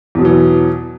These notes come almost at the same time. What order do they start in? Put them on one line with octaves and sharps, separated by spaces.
E2 B2 F#3 E3